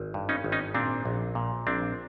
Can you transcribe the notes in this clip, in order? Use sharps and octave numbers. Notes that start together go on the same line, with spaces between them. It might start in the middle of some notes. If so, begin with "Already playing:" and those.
Already playing: G#1
G2
C#4 D#4
G#1
C#4 D#4
A#2 C4 D4
A#1
A#2
A#1 C4 D4